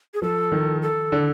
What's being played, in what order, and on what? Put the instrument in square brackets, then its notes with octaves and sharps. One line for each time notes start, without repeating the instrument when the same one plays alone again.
[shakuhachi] G#4
[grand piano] F3 [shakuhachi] A4
[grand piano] D#3
[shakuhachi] A4
[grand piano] D3